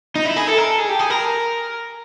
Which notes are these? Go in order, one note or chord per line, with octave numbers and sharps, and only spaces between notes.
D#4
E4
G#4
A4
A#4
A4
G#4
G4
G#4
A#4